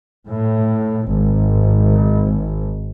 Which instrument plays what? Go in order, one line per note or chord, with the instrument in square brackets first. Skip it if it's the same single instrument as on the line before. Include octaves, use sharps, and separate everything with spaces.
[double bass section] A2
G#1